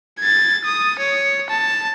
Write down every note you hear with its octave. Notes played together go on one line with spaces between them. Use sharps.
G#6 A6
D#6
C#5
A5